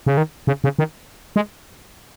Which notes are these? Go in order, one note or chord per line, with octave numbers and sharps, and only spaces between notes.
C#3
D#3
C#3
C#3
D#3
G#3